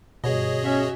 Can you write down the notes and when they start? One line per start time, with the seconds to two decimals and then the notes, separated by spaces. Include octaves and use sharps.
0.24 G1 B2 G#4 C#5 D#5
0.62 C#4 F#4 E5